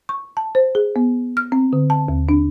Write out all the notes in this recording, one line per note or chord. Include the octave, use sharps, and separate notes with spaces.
C#6
A5
C5
G#4
B3
F6
C4
D3
A5
D#2
D4